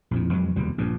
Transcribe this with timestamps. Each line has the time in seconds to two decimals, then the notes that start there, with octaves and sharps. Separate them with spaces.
0.11 A#1 F2 A2
0.31 F2 F#3 G#3
0.56 F1 D#2 B2 G3
0.78 A#1 G2 A#2